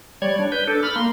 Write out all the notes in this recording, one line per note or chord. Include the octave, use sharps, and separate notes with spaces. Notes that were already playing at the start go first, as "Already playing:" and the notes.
G3 C#5 D5 G#6
D4
B4 G6
D4 A4
B5 F6
A#3 C6